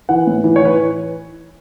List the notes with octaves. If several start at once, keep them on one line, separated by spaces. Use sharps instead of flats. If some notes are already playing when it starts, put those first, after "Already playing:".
E3 F#5
A2
E3
C#5
E3 B4